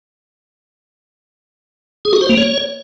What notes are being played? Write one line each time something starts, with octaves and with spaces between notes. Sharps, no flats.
G#4
F#4
C5
A#3
C#5